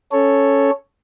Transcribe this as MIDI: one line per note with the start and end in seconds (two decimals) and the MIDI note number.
0.12 0.71 61
0.12 0.71 69
0.12 0.71 73